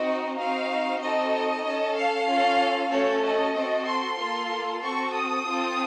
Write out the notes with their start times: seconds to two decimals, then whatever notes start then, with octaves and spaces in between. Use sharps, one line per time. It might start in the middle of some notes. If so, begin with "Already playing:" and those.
Already playing: C4 D#4 F#4 D#5
0.36 C4 D#4 F#4 F5
1.00 C4 D#4 F#4 A4 D#5
1.64 C#4 A4
1.96 F5
2.27 C#4 F4 A4
2.90 A3 C#4 F#4 A4 C#5
3.22 D#5
3.55 C4 F#4 A4
3.86 C6
4.18 A#3 F4 A4
4.81 C4 F#4 A4 C#6
5.13 D#6
5.45 C4 F4 A4